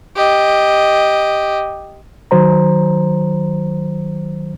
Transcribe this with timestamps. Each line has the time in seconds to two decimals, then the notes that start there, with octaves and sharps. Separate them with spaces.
0.16 G4 D#5
2.31 D#3 F#3 C5 A#5